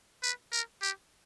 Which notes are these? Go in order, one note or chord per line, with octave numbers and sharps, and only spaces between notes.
B4
A#4
G4